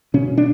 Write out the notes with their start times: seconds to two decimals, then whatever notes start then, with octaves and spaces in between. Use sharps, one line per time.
0.14 B2 C#4
0.38 D4